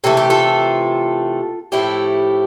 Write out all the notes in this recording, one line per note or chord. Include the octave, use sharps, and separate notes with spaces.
C3 E3 A3 A4
G4
F4 A4
A2 F3 A3 E4 G4